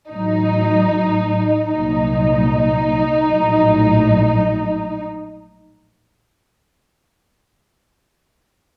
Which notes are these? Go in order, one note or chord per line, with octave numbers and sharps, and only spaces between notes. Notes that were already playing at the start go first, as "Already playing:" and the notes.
A1 A2 F#3 D#4
C2 A#2 F#3 D#4
A#1 A2 F#3